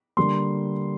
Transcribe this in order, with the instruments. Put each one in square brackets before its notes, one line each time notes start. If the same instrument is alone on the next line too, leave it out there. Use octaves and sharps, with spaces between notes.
[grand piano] D3 G3 A#3 C6